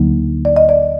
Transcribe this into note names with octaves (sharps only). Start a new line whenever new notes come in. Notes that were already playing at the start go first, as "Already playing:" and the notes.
Already playing: D2 D3 F#3 A#3 D#4
D5
D#5
D5